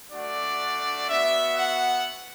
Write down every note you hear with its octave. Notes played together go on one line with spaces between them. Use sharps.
A3 D4 F#4 D5
B3 F#4 E5
F#5